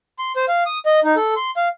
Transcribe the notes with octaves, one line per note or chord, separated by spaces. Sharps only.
C6
C5
F5
D#6
D#5
D#4
A4
C6
F5